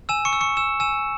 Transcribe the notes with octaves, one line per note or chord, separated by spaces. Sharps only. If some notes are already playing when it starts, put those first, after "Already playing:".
G#5 E6 E7
C#6 C#7
E6
C#6 C#7
E6 E7
G#5 E6 E7